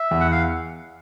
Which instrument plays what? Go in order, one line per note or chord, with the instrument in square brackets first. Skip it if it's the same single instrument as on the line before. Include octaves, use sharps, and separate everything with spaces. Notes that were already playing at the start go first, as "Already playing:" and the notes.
Already playing: [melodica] E5
[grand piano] E2
[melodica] F#5
F5